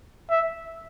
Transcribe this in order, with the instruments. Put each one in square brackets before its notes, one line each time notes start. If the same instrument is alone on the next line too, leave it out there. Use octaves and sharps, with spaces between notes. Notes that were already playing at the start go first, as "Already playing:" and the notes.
[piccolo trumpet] E5